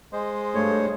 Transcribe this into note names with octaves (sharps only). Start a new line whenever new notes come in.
G#3 C5 D#5
G2 A3 C#5